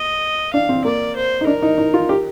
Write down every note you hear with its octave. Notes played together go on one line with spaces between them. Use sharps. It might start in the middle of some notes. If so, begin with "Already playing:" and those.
Already playing: D#5
D4 F5
C4
A#3 D5
C5
D#4
D4 A#4
D#4
D#4
F4
G4